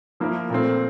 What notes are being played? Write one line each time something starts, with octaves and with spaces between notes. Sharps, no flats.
F3 A#3 E4 A#4
A#2 A3 C4